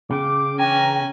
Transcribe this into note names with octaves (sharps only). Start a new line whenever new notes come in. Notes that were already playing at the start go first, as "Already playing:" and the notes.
C#3 F5 G5 D6
E3 C#4 D4 G5 G#5 A#5